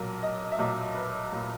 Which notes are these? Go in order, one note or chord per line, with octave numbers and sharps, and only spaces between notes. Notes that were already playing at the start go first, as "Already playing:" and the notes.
Already playing: B1 A#2 F#3 A#4
D#5
E5
B1 A#2 F#3 D#5
B4
A#2 F#3